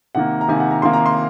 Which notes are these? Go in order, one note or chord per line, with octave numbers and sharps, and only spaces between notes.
C3 D#3 A#3 F#5
A#5
C3 D#3 A#3 G#5
F#5
A#5
C3 D#3 A#3 C6
A#5
C6